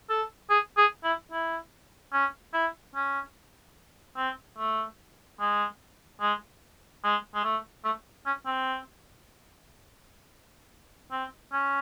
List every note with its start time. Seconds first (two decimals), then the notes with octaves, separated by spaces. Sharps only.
0.10 A4
0.50 G#4
0.77 G#4
1.04 E4
1.32 E4
2.13 C#4
2.53 E4
2.95 C#4
4.17 C4
4.58 A3
5.40 G#3
6.21 G#3
7.04 G#3
7.35 G#3
7.44 A3
7.85 A3
8.26 C#4
8.46 C4
11.12 C4
11.53 C#4